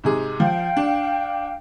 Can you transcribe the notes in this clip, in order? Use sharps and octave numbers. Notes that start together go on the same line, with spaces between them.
G#2 C3 G#4
F3 F5 G5
D4